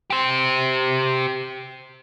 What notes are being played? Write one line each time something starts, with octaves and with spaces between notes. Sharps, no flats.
G4 C5